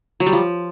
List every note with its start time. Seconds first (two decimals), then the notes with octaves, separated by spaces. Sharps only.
0.20 F#3
0.26 G3
0.33 F3